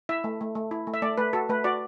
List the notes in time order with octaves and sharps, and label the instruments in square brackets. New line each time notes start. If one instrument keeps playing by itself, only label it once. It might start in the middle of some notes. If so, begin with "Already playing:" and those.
[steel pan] E4 E5
A3
A3
A3
E4
A3
E5
A3 D5
A3 B4
F#4 A4
A3 B4
F#4 D5